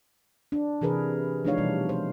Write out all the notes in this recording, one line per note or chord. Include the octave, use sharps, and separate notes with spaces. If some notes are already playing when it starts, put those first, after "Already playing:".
D4
C3 E3 G#4 A#4 B4
F3 A3 D4 D#4 C#5 F5
B2 E3 G3
C5